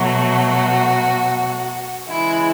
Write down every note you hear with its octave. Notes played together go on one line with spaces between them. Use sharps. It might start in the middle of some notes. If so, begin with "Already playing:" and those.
Already playing: B2 F#3 A3 F#4
C#3 E3 G#3 E4